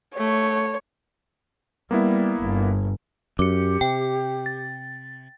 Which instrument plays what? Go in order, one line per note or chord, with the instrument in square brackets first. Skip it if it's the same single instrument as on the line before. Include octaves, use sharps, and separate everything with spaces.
[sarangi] A3 [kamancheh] C#5
[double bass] G3 [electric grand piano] A#3 B3 E4
[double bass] G1
[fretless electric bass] F#2 [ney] G4 [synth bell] D6 C#7
[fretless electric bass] C3 [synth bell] G5
[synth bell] A6